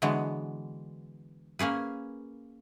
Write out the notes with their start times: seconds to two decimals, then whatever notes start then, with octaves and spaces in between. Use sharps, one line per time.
0.02 D3 E3 F#3 G#3 B3
1.59 A#3 C#4 G#4 B4